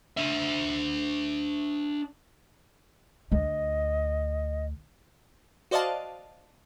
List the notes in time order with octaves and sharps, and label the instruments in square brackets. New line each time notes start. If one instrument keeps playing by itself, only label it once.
[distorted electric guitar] D4 E5
[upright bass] D2 [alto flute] D#5
[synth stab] F#4 C5 D5 D#5 F5 A5